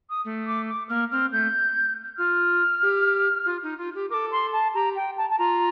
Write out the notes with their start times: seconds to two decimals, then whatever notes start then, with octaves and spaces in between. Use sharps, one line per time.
0.10 D#6
0.25 A3
0.47 D6
0.68 D6
0.89 A#3 F6
1.11 C4 F6
1.32 A3 G6
2.17 F4 F6
2.83 G4
3.46 F4
3.63 D#4
3.78 F4
3.95 G4
4.10 A4 A#4 D6
4.32 C6
4.53 A5
4.74 G4 A#5
4.96 G5
5.18 A5
5.30 A5
5.39 F4 A#5